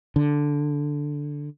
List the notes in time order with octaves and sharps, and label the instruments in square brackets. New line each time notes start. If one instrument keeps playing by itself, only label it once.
[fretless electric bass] D3